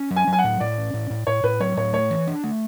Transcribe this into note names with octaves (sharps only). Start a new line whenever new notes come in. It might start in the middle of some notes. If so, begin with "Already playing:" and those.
Already playing: C#4
F#3
G#5
F#3
G#5
F#5
A2
A2 D5
C#4
A2
A2
A2 C#5
A2 B4
F#3 C#5
A2 C#5
A3 C#5
E3
D4
A3